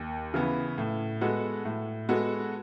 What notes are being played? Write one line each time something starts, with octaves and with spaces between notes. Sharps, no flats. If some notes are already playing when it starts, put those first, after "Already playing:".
Already playing: D#2
C#3 E3 B3
A2
G#3 B3 F#4 A4
A2
G#3 B3 F#4 A4